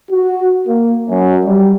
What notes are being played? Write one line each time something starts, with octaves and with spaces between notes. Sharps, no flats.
F#4
A#3
F#2
G3